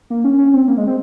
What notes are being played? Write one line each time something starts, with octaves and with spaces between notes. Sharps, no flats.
A#3
C#4
C#4
C4
A#3
G#3
C4